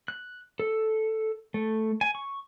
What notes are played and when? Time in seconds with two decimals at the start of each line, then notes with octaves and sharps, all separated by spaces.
0.08 F#6
0.60 A4
1.54 A3
2.01 G#5
2.15 C#6